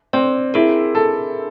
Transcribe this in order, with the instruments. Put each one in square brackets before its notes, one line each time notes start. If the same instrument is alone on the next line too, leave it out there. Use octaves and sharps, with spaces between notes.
[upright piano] C4 [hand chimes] C5 D5
[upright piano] E4 [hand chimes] G#4 A#4
[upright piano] A4